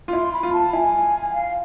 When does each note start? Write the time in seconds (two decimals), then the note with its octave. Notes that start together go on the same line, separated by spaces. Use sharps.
0.08 F4
0.13 E4 C6
0.33 B5
0.43 F4
0.53 A5
0.73 E4 G#5
1.33 F5